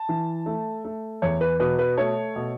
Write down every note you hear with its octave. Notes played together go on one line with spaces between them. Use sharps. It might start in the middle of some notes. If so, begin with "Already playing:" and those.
Already playing: A5
E3
A3
A3
E2 C#5
B4
B2 B4
B4
A3 C#5
B2